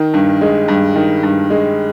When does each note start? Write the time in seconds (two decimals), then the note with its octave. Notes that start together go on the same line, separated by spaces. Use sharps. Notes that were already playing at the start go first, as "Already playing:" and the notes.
Already playing: D#3
0.14 G2
0.41 G#3
0.68 G2
0.96 D#3
1.23 G2
1.50 G#3